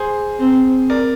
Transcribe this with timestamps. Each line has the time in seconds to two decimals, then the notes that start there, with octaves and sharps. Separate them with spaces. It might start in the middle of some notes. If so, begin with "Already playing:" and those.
Already playing: G#4 C5
0.40 C4
0.90 A#4 D5